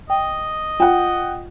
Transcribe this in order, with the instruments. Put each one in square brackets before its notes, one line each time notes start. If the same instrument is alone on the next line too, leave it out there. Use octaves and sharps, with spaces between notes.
[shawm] D#5 [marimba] G5
[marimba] F4 [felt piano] F#5 G5